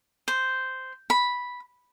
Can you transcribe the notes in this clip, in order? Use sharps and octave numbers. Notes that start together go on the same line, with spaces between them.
C5
B5